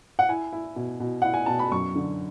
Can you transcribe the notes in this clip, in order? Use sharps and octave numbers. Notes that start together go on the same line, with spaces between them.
F#5
E4 G#5
E4
B2
B2
E4 F#5
G#5
B2 A5
B5
F#2 C#6
D3